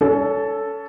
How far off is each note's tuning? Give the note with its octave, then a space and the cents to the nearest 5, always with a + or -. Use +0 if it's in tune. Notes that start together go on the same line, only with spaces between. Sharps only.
C#4 +30 A4 +0